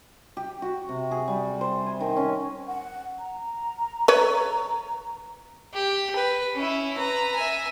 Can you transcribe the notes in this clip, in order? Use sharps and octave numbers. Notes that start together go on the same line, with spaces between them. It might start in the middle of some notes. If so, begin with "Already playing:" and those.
G4
F#4
C3
G#4
G3
C5
G#5
D#3
C#4
F#5
A#5
B4 C#5
G4
B4
C#4 E4
B4 A#5
E5 G#5